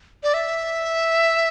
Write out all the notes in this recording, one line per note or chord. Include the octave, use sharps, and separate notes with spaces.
D5
E5